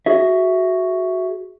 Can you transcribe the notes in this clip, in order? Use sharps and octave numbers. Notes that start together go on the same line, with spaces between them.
F#4 G#4 E5